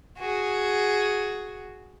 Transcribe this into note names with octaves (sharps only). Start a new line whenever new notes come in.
F#4 G#4